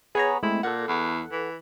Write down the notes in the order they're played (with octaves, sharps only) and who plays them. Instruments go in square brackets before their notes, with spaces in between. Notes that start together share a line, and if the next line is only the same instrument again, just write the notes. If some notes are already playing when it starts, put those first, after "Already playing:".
[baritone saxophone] B3 [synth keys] G#4 C#5 A#5
[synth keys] G#3 A3 C4 [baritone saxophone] E4
[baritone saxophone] A#2 [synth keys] A4 F#5
[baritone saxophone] E2
E3